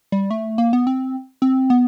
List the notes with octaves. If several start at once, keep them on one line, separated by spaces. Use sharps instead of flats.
G3
A3
A#3
B3
C4
C4
B3